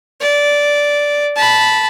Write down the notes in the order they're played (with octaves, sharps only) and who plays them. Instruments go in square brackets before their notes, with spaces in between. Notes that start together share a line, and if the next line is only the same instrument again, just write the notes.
[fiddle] D5
A5 B5